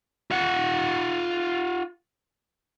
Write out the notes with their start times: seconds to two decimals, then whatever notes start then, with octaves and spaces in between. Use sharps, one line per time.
0.31 F4 F#5